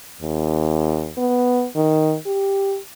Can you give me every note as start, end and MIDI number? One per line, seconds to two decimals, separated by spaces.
0.21 1.11 39
1.17 1.66 59
1.75 2.16 51
2.26 2.77 67